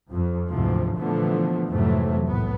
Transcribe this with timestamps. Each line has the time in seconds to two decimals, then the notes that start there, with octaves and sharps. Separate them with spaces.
0.11 F2
0.48 D2 G#2 C3 E3 F3
0.96 A#2 D3 E3 F3 A3 B3
1.69 F2 G#2 C3 E3 F#3 A3
2.25 C2 A2 B3